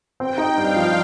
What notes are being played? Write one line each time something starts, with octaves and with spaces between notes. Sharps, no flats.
C4 G5
D#4
G2 F5
F3